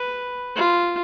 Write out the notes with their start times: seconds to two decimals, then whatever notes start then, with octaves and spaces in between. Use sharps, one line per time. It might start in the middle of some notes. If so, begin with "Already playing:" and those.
Already playing: B4
0.55 F4